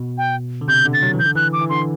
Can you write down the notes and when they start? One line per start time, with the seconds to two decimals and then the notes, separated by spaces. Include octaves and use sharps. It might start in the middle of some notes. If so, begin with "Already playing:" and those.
Already playing: B2
0.18 G5
0.61 D3
0.68 C3 G6
0.85 D3
0.94 A6
1.03 F#3
1.13 E3
1.19 G6
1.25 D3
1.35 E3 F#6
1.53 D6
1.61 E3
1.69 D3 C6